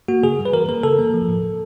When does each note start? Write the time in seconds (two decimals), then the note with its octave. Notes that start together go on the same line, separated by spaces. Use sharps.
0.08 A#3 F#4
0.23 C#3 G#4
0.39 G3
0.45 B4
0.53 E3 A#4
0.69 A#3 A#4
0.83 C#3 A4
0.99 A#3
1.14 F3
1.28 A2
1.43 A2